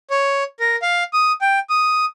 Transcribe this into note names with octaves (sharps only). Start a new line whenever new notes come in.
C#5
A#4
F5
D#6
G5
D#6